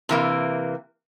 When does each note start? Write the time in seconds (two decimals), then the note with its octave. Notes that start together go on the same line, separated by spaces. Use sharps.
0.09 C3 E3 A#3